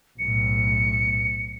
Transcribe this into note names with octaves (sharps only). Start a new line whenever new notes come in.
B1 A2 C#7